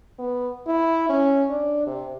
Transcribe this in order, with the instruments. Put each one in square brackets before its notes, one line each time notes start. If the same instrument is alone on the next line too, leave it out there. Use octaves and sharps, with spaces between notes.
[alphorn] B3
E4
C#4
D4
C3